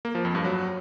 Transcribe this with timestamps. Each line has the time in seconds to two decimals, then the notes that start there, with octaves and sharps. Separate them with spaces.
0.05 A#3
0.15 F3
0.25 F2
0.35 G2
0.45 F#3